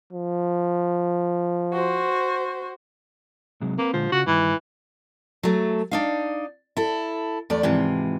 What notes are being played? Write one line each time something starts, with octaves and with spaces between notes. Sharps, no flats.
F3
F#4 C5
C3 F#3 G#3
A#3 C4 B4
A#2 D3 F3 G#3
C#3 F4 F#4
G2 D#3 E3
F#3 A3
D4 D#4 F5
E4 A4
E2 A3 D5
G#2 C3 E3 F3